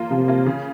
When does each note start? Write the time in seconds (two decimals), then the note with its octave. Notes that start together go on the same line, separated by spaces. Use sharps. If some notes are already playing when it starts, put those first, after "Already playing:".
Already playing: A#3 F4
0.10 C3 F3
0.28 A#3 F4
0.46 C#3